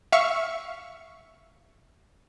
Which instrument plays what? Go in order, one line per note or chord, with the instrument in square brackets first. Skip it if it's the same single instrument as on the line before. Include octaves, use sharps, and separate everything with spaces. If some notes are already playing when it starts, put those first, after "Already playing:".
[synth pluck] E5 F5 C#6